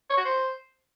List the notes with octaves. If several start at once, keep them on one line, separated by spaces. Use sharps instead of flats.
C#5
F#4
C5